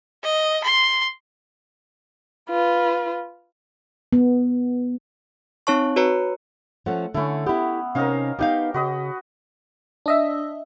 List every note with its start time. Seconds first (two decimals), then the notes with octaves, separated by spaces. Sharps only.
0.23 D#5
0.64 C6
2.50 F4 B4
4.13 B3
5.67 C4 D#4 C#5 A5 C#6
5.96 F#4 B4 C#5 A#5 C#7
6.86 F3 A3 C#4 F#5
7.14 D3 A3 C#4 E4
7.46 B3 E4 G4
7.95 C3 C#4 D#4 A#4 D#5 F5
8.39 B3 D#4 G4 F5 G5
8.74 C#3 F#4 B4 D#5
10.06 D4 D#5 E5